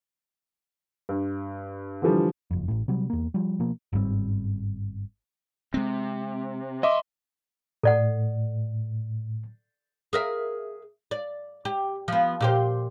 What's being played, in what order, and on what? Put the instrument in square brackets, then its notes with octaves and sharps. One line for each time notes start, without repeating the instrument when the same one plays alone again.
[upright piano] G2
D3 E3 F3 G3
[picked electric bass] F#1 F2
A1 A2
C3 F#3 G3
E2 A#3
F3 G3
B2 F3 A#3
G1 G#2 G3 C4
[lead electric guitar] C3 [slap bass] G#3 C4
[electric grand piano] D#5 E5 D6 [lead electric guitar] B5 C6
[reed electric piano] A2 [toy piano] A4 D5 F#5
[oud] G#4 A#4 E5
D5
G4
F3 B3
A#2 G4 C5